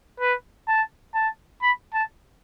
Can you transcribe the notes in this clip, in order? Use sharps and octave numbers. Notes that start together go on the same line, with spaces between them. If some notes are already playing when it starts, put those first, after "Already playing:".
B4
A5
A5
B5
A5